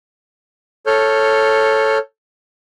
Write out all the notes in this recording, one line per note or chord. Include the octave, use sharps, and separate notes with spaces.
A4 C#5 F6 G6